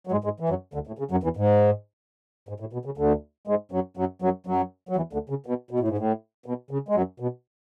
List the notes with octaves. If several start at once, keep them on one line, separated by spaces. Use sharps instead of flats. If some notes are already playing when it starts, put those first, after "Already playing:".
F#3
G#2 G#3
G#2 G#3
E3
F#2 F#3
D2 D3
A2
C#3
F#2 F#3
E2 E3
G#2
G#2
A2
B2
C#3
D2 D3
G#2 G#3
F#2 F#3
F#2 F#3
F#2 F#3
F#2 F#3
F#3
E2 E3
D2 D3
C#3
B2
B2
A2
G#2
A2
B2
C#3
G#3
F#2 F#3
B2